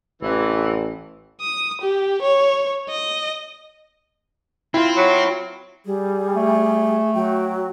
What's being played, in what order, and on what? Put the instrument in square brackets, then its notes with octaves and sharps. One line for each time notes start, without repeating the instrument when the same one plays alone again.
[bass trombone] A1 [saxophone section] C3 E3
[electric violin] D#6
G4
C#5
D#5
[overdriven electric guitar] C4 [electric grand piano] E4 F4
[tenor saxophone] F#3
[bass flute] G3 [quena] G#4
[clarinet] A3
[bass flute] F#3 [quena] G5